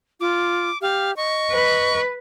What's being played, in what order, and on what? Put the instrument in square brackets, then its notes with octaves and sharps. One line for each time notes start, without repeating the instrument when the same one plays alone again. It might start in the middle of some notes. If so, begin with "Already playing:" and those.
[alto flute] F4 [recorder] D6
[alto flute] G4 [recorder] F5
[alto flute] D#5 [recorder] C#6
[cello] B4